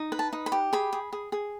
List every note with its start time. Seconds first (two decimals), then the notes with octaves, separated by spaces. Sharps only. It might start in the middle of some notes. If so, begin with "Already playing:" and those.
Already playing: D#4
0.12 B4
0.19 A5
0.33 D#4
0.46 B5
0.52 G4
0.73 G#4 B5
0.93 G#4
1.13 G#4
1.32 G#4